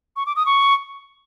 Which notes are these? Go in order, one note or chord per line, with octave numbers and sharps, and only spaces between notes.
C#6
D6
D#6
C#6